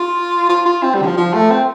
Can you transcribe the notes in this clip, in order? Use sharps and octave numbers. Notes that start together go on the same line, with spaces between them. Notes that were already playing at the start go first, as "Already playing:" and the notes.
Already playing: F4
F4
F4
C4
G3
D3
F3
F3
A3
C4